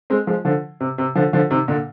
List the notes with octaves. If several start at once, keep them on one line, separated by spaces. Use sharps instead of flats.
G#3 C4
F3 G#3
D3 F3
C3
C3
D3 F3
D3 F3
C3 D#3
A#2 D3